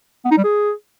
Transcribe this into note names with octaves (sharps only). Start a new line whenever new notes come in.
B3
D#4
G3
G#4